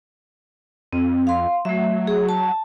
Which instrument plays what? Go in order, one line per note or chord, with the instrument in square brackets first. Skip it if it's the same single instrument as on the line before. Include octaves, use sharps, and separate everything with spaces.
[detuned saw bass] F2 [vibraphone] C4
[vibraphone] F5 C6
[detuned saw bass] F#3 [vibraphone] A3 E5
[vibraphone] G#4
A5